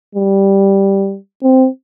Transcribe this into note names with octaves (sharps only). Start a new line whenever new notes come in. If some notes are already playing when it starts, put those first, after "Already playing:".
G3
C4